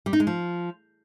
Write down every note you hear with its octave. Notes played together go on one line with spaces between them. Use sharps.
G3
D#4
G#3
F3